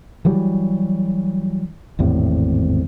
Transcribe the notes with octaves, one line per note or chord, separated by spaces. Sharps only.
E3 F#3 G3
G#1 E2 A2 C3